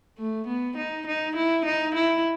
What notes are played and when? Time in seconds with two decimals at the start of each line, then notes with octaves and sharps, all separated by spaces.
0.18 A3
0.47 B3
0.77 D#4
1.07 D#4
1.36 E4
1.65 D#4
1.95 E4